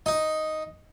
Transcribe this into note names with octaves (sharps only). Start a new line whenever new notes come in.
D#4